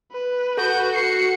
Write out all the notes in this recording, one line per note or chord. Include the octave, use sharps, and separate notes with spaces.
B4
F#4 A4 G6
C7 C#7